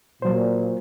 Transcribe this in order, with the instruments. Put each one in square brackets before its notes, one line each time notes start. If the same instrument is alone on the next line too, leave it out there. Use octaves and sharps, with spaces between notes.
[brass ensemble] A#2 [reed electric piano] F#3 C5